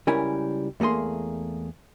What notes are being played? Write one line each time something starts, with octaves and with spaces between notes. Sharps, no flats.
C#2 G3 C#4 E4 A#4 G#5
E2 A3 A#3 G#4 C6